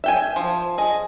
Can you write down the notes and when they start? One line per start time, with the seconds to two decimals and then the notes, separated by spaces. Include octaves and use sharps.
0.04 E5 G5 G#5
0.36 F3
0.78 G#4 D#5